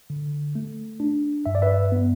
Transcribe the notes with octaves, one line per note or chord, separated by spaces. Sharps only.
D3
A3
D4
G2 E5
D5
B4 E5
B3